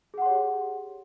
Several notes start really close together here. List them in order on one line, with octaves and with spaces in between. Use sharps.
G#4 F#5 C6 C#5 G4